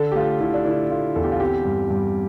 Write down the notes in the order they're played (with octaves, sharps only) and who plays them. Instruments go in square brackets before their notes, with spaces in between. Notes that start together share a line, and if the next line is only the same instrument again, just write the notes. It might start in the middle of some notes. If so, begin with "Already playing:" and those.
Already playing: [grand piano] D3 A4
G4
A3 F4
D3 E4
D4
D3 E4
A3 F4
E2 A4
G4
F4
C4 G4
G2
G2